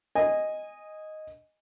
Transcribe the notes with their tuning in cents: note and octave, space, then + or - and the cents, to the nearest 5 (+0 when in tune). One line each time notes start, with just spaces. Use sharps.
D#5 +0 G#5 -15